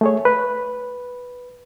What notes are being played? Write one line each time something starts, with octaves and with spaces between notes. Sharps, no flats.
A3 G#4 C#5
B4